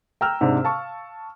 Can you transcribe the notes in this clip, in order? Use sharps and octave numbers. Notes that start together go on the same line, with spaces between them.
G5 A#5 E6 F6
G#2 C3 D4
F5 A5 C#6